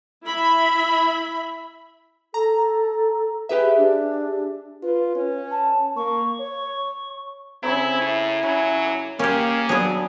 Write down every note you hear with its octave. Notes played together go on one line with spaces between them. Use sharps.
E4 E5 B5
A4 A#5
G4 G#4 B4 E5
D4
F4 B4
C#4
A5
A#3 C#6
C#5
C#3 C4 E4 C#5 A#5
A2 E4
C#3 F#3
D6
C#3 A#3 C#4 G4
F#3 B3 D4 G#4